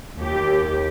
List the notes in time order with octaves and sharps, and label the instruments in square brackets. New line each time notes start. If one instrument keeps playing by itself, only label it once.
[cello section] D#2 G4